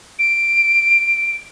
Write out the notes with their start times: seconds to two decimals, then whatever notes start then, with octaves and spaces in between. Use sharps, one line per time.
0.19 D7